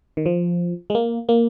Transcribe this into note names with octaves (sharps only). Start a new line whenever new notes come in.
D#3
F3
G#3
A#3
A#3